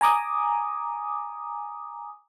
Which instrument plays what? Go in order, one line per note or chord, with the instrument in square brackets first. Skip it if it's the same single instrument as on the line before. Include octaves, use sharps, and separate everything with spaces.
[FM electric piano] G#5 A#5 D6 D#6